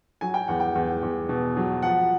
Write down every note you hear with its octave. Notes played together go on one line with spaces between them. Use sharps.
F#3 G#5
G5
E2 F#5
G5
E2
E2
B2
F#3
F3 F#5